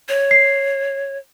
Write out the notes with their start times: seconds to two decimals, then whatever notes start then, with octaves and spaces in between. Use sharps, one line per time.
0.09 C#5
0.31 C7